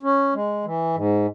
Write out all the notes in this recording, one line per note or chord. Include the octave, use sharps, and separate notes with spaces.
C#4
G#3
E3
G#2